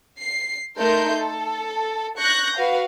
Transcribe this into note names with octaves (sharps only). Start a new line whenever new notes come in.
C7
A3 D#4 A#4 C6 G6
A4
C#6 F#6 G6 A#6
F#4 B4 F5